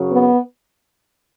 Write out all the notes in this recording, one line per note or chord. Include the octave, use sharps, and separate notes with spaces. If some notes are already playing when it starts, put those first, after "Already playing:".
Already playing: F#2 C#3 F#3
B3